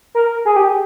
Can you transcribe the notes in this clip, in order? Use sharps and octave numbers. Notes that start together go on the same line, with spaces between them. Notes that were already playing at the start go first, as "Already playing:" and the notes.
A#4
G#4
G4